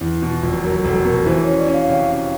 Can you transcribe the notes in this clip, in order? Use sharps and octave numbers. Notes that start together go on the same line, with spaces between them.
E2 E4
B2
F4
F1
F#3 A#4
F1 A4
B2 A#4
E3 C5
C#4 C#5
D5
C#4 F5
C3
C#4